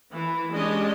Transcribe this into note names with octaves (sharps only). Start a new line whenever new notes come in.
E3
G#3 C#4 D4 G4 D#5